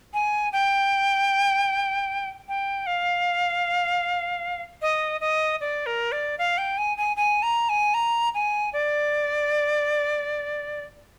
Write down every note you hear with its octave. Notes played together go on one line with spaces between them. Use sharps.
G#5
G5
G5
F5
D#5
D#5
D5
A#4
D5
F5
G5
G#5
G#5
G#5
A#5
G#5
A#5
G#5
D5